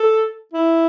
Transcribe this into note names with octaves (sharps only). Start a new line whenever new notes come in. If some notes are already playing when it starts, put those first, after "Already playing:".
Already playing: A4
E4